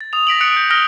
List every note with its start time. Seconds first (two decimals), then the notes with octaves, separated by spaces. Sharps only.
0.01 A6
0.13 D#6 F7
0.27 A#6 B6 D7 F#7
0.41 D#6 F#6 B6 C#7 D7
0.56 G6
0.70 D#6 F6 A#6 D7 G7